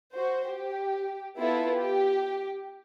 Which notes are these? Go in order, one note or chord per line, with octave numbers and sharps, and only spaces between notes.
F#4 C5
G4
B3 E4 F4 A4 B4
G4